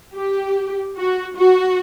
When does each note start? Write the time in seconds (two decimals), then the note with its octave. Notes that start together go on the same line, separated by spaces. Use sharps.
0.16 G4
0.97 F#4
1.37 F#4